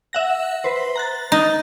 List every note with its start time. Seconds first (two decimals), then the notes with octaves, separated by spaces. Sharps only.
0.13 E5 F#5 A#6
0.64 B4 C5
0.96 A#5 F#6 A6
1.32 D#4